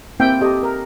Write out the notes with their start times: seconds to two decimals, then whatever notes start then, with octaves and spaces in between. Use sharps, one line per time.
0.20 A#3 C4 E4 E5 G5
0.41 G4 A4 D#5
0.63 A#4